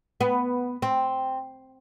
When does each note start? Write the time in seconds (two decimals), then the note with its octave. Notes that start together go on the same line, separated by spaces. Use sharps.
0.21 B3
0.82 C4